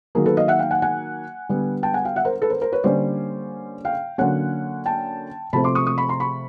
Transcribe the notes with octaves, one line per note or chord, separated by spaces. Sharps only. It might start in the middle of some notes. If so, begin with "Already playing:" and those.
D#3 F#3 A#3 G#4 A#4
A4 B4
D#5 F5
E5 F#5
F5 G5
F#5 G#5
F#5 G#5
D3 G3 B3
G5 A5
F#5 G#5
F5 G5
E5 F#5
A#4 C5
A4 B4
A#4 C5
A#4 C5
B4 C#5
D3 G3 A#3 C#4 C5 D5
F5 G5
D3 F#3 A#3 C#4 F#5 G#5
G5 A5
C3 F3 A3 C4 A5 B5
C6 D6
C#6 D#6
C#6 D#6
B5 C#6
A#5 C6
B5 C#6